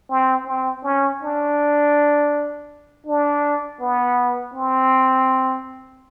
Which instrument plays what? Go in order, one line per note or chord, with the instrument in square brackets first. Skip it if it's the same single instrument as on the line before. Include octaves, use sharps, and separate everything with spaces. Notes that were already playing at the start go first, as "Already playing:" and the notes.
[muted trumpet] C4
C4
C#4
D4
D4
B3
C4